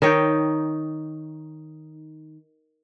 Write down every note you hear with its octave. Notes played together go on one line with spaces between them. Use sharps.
D#3 D#4 C#5 G5